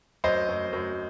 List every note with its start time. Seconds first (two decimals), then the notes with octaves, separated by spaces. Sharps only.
0.24 F#2 C5 D#5
0.48 F#2
0.73 F#2